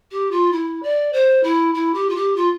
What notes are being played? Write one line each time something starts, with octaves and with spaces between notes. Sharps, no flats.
G4
F4
E4
D5
C5
E4
E4
G4
F4
G4
F4